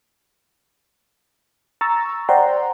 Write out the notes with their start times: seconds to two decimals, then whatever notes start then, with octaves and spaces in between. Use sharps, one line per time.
1.81 A#5 C#6 E6 A6
2.29 C5 D5 F#5 G5 A#5 C6